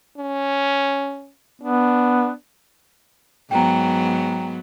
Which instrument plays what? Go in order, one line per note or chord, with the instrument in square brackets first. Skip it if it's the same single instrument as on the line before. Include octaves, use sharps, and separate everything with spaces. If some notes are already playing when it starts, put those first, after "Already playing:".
[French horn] C#4
[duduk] B3 [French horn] D4
[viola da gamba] G#2 F#3 B3 [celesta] G5 A#5